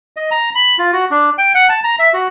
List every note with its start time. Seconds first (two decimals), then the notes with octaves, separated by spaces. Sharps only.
0.17 D#5
0.31 A#5
0.55 B5
0.78 F4
0.93 F#4
1.11 D4
1.38 G5
1.55 F#5
1.69 A5
1.84 A#5
1.99 E5
2.14 F#4